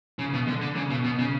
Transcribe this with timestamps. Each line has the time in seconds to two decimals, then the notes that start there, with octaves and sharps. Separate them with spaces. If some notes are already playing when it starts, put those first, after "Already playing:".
0.19 C#3
0.33 B2
0.48 D3
0.62 D3
0.76 C#3
0.90 B2
1.04 B2
1.19 C#3